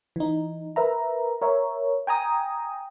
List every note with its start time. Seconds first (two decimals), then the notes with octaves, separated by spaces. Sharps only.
0.16 E3 D#4
0.76 A#4 B4 E5 A#5
1.42 A#4 C#5 E5
2.07 G5 G#5 A#5 D#6